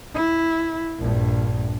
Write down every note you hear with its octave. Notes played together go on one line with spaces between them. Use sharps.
E4
A#1 G2